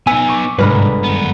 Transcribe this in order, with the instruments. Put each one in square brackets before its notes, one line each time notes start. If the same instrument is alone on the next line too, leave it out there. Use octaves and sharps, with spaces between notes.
[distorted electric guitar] B3 D#4 [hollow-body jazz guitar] G#5 [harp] E6
[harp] C#6 D6
[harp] G1 G#3 B5 [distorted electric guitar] C2 G#2 [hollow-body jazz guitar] D4 A#4 B4
[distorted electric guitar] F#2 B3